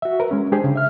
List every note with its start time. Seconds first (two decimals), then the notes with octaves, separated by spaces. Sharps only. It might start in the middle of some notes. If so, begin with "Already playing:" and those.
0.02 F#4 E5
0.20 A#4 B4
0.31 G#3 C#4
0.52 G#3 D4 G4 G#4 C5
0.64 C#3
0.76 E5 F6